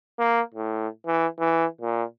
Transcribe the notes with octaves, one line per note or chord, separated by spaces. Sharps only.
A#3
A2
E3
E3
A#2